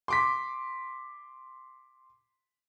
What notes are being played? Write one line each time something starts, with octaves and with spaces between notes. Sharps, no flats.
C6 D6 B6